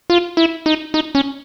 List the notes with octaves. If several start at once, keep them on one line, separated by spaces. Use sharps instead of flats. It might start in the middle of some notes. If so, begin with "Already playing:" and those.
F4
E4
D#4
D#4
C#4